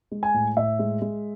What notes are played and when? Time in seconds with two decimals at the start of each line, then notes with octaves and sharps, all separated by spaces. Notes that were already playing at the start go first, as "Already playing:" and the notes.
0.11 G#3
0.23 G#5
0.34 A2
0.57 A2 E5
0.79 G#3
1.02 G#3